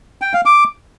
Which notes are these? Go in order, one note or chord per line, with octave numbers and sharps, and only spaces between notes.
G5
F5
D6